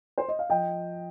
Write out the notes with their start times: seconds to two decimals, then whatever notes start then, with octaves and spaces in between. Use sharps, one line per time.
0.18 C5
0.29 D#5
0.39 F5
0.50 F3 D#5 G5